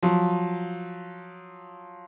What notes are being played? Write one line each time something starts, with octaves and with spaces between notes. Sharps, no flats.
F3 F#3